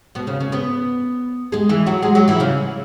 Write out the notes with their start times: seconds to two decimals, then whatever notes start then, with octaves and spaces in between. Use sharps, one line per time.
0.15 B2 B3
0.27 C#3 C#4
0.40 C#3 C#4
0.52 B3 B4
1.52 G#3 G#4
1.69 E3 E4
1.86 F#3 F#4
2.02 G#3 G#4
2.15 F#3 F#4
2.28 E3 E4
2.40 C#3 C#4